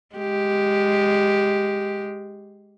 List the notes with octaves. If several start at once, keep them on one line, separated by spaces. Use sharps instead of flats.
G#3 G4